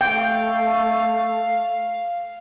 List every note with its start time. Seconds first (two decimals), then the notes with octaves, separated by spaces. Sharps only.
0.01 A3 F5 G5